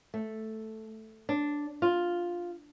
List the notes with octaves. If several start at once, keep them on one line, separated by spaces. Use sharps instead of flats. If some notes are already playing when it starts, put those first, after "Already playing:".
A3
D4
F4